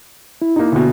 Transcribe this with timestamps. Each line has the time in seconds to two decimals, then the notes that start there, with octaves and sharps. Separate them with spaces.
0.42 E4
0.56 A#3 D#4
0.72 D2 B2